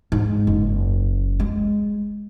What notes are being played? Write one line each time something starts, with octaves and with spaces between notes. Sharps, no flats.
G#2
F#1
G#3